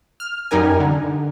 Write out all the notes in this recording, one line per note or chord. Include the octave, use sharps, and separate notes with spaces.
F6
F#2 G3 D#4 A#4 G#5
D3